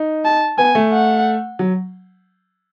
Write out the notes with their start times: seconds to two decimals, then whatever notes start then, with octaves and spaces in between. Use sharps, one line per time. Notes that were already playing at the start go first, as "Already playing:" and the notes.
Already playing: D#4
0.25 A5
0.58 B3 G#5
0.75 A3
0.92 F#5
1.59 F#3